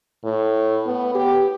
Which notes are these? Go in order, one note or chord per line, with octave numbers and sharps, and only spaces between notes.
A2
B3
G4